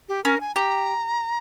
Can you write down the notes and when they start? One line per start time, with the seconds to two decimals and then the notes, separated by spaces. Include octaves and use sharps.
0.09 G4
0.24 C#4 A#4
0.40 G#5
0.55 G4 A#5